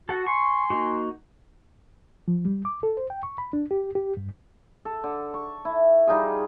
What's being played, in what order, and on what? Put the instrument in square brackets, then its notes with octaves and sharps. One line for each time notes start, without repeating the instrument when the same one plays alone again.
[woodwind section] F#4 [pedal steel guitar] A4 F#5
[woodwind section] G#5 C6 [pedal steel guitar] C#6
[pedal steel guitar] A#3 D#4 F#4
[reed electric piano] F3
G3
D6
A4
C5
G5
C#6
B5
D4
G4
G4
G2
[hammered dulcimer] A4
D3
C#6
E4
G3 D#4 F4 G#4